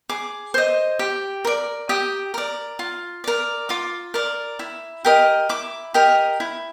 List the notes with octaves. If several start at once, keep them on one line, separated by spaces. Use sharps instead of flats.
G#4 D6
C5 D#5
G4
A#4 D5
G4 D#6
A#4 D5
F4
A#4 D5
F4 D6
A#4 D5
E4
G4 A#4 D#5
E4 D6
G4 A#4 D#5
E4